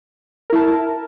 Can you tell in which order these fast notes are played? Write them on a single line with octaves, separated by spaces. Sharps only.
A#4 E4 A5